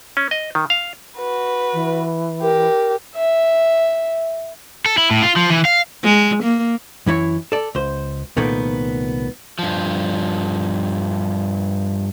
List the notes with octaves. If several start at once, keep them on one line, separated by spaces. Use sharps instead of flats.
C#4
D#5
D#3
F5
F#4 B4
E3
G4 A#4
E5
A4
E4
A2
F4
F3
E3
F5
G#3
A#3
F#2 E3 E4 C#5
A4 D5
C#2 C5
C2 A#2 D#3 A3 B3
G2 F3